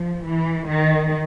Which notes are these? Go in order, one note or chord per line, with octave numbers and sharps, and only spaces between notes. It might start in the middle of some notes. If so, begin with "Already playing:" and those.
Already playing: F3
E3
D#3